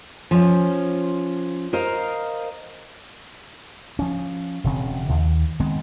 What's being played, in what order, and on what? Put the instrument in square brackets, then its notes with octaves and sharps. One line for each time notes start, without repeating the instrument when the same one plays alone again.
[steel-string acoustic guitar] F3 C#4
A#4 C5 D#5 F5
[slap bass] F3 C#4
E1 C#3 C4
E1 D#2
D#3 G#3 B3 C4